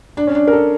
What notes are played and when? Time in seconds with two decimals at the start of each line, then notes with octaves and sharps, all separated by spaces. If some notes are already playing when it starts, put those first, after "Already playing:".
0.17 D4
0.27 C#4
0.35 D4
0.48 A#4
0.53 A4